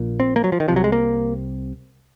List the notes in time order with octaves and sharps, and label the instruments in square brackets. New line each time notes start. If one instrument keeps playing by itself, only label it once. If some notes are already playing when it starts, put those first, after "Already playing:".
Already playing: [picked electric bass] A#1 A#2
C4
A#3
F#3
F3
D#3
C3 F3
C2 F#3
G#3
A#3